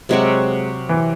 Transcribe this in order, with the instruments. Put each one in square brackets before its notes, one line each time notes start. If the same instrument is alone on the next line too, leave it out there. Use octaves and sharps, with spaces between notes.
[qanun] C3 F#3 C4 F#4 [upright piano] G#3
[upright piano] E3